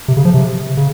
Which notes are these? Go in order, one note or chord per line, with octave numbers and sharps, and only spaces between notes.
C3
C#3
F3
C3
C#3